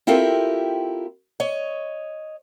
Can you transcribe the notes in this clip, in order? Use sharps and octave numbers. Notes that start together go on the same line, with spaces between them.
C4 E4 F4 G4 A4 A#4
C#5 D#5